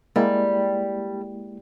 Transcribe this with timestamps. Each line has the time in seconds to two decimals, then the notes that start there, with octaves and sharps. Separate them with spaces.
0.16 G3 G#3 A#3 E4